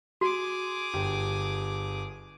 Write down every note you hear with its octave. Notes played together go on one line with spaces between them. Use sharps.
F#4 G#4 D6
G1 G4